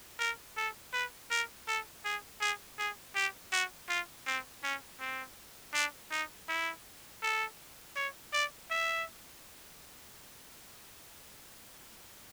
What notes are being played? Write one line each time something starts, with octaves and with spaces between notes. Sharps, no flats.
A#4
A4
B4
A#4
A4
G#4
G#4
G#4
G4
F#4
F4
C4
C#4
C4
D4
D#4
E4
A4
C#5
D5
E5